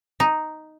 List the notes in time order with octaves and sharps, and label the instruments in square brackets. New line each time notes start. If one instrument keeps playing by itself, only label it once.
[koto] D#4